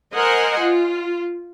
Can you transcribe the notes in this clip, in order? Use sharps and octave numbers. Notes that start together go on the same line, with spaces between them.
A#4 C5 D#5 F#5 G#5
F4